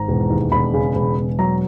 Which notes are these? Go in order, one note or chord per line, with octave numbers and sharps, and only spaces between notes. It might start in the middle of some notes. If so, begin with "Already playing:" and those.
Already playing: G#1 A#5
E1
D#2
E1 B5
C#3
E1
E1
F#3 A#5